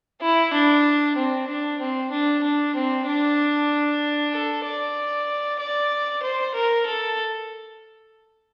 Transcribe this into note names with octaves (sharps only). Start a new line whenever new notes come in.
E4
D4
C4
D4
C4
D4
D4
C4
D4
A4
D5
D5
C5
A#4
A4